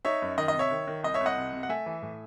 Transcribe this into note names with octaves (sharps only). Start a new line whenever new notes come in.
D#4 C#5 E5
F#2
D#3 D#5
D#5
C3
C#5 E5
D#3
D#3
C2 D#5
C#5 E5
C2
D#5 F#5
C3
C3
F#5
A3 E5 G#5
E3
A2